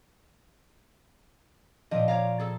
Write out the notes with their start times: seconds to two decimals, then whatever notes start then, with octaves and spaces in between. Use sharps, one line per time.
1.91 A#2 F3 D4 D#5
2.08 C#5 D5 F5 A#5
2.39 G#4 A4